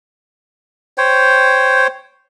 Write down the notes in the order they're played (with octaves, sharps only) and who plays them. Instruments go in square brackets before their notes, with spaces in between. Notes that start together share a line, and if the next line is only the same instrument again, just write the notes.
[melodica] C5 C#5 G5